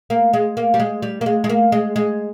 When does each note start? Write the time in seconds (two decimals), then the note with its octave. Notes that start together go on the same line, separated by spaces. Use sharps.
0.10 A#3
0.33 G#3
0.57 A#3
0.74 G3
0.80 G#3
1.02 G3
1.21 A#3
1.26 G#3
1.44 G#3
1.49 A#3
1.72 G#3
1.96 G#3